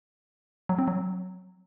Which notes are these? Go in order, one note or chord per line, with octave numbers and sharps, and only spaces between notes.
F#3
C4
F#3